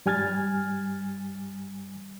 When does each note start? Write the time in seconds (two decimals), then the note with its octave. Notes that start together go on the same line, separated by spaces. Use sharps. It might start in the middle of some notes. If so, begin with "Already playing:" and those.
0.06 G2 G3 G#5 F6 G#6 A6